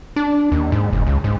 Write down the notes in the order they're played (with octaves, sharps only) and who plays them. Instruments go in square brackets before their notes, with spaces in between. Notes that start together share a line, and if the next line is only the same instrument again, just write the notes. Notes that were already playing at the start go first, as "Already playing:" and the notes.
[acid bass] D4
D#2
G#2
F#1
C#2
G#2